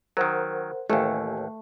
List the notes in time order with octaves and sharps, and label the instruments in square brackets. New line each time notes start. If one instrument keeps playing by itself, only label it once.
[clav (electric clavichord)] D#3 F#3 [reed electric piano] A#4 C5 F#5
[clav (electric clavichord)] A1 D#2 [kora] A3 [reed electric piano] G#5